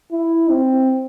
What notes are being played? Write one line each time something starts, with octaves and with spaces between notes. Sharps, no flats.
E4
C4